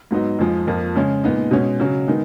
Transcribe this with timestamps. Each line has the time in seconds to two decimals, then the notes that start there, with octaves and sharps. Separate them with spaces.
0.11 G#2 F#3 B3 D#4
0.39 F2 F3 G#3
0.67 F2 F3 A#3
0.96 C#3 G#3 C#4
1.24 A#2 G#3 B3 D#4
1.51 B2 G#3 C#4
1.80 C#3 F#3 C#4
2.08 D#3 G#3 B3 D#4